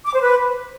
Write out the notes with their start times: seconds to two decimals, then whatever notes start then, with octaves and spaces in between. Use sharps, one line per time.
0.06 D6
0.13 C5
0.21 B4